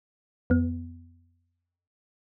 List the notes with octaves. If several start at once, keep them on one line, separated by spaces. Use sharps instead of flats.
F2 B3